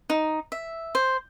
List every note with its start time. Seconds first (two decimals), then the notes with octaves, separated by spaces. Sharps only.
0.10 D#4
0.52 E5
0.95 C5